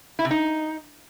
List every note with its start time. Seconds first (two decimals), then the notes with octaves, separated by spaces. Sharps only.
0.19 E4
0.25 C3
0.31 D#4